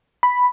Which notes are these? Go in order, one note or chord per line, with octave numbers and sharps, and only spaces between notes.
B5